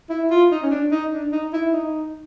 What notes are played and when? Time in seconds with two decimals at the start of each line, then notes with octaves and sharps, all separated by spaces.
0.10 E4
0.31 F4
0.51 D#4
0.63 C#4
0.71 D4
0.91 D#4
1.12 D4
1.32 D#4
1.53 E4
1.73 D#4